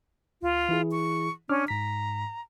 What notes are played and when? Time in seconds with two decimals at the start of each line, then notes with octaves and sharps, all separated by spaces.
0.43 D2 F4
0.69 E3 E4 G#4
0.92 C#6
1.49 C#4 D4 D6 F6
1.68 G#2 A#5 B6